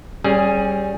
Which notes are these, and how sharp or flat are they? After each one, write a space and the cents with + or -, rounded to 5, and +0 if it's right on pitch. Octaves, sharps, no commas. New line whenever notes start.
G3 +0 C#4 -20 G#4 +5